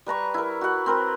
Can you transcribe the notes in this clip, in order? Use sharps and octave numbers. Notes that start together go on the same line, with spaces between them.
G3 B4 A#5 C#6
E4 A#4
F#4 F#5
C4 A#4 B4